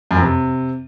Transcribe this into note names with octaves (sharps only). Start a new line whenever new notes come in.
F#2
F2
C3